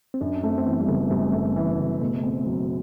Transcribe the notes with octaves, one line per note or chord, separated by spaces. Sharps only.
C4
F#2 D4
A3 C4
C4
E3 B3
G3
F#1 A3
F#2 G3
A3
E3
F#1
B2 A3
C4
F#3